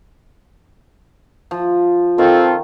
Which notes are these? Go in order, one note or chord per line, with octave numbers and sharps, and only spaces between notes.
F3
D#3 C4 F4 A4